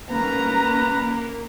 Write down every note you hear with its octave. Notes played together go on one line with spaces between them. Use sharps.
A#3 C#4 B4 A#5